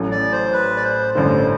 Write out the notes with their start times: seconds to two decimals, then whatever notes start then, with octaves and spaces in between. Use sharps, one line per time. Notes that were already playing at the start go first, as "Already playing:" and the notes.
Already playing: A1 A2 F#3
0.11 D5
0.32 C5
0.53 B4
0.76 D5
0.84 C5
1.15 A1 G2 D3 C5